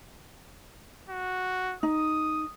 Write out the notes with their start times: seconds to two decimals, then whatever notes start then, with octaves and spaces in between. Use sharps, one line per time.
1.09 F#4
1.83 D#4 D#6